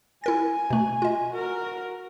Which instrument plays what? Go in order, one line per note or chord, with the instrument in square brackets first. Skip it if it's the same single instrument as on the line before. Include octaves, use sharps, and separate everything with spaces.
[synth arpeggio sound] E4 A#4 A6 [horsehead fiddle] G#5
[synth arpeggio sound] B2 A3
F4 D#5
[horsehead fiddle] F#4 A#4